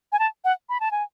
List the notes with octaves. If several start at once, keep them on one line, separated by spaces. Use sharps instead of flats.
G#5
A5
F#5
B5
A5
G#5